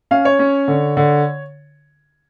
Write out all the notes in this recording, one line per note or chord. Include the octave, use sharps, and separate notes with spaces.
C#4 F5
C#5
C#4
D3
D3